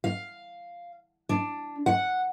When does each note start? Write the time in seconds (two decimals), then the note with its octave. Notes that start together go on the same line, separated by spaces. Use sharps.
0.04 F5
1.29 D4
1.86 F#5